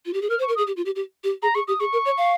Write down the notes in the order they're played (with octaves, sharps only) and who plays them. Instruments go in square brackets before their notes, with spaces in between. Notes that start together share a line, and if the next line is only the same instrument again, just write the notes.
[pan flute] F4
G4
G#4
[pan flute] A#4 [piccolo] F6
[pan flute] C5
[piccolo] C#6
[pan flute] A#4
[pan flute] G#4 [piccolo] D#6
[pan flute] G4
F4
G4
G4
G4
[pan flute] G#4 [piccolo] A#5
[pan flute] G#4 [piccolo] C#6
[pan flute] G4 [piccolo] D#6
[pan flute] G#4 [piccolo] C#6
[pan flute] A#4
C#5
F5